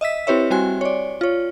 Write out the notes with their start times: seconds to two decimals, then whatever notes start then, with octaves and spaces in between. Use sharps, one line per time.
0.01 D#5 E5 E6 B6
0.27 C4 E4 G4 B4 C#5 E5
0.50 G3 C4 F#4 G#5 C6
0.81 C#5 D5
1.21 F4 C#5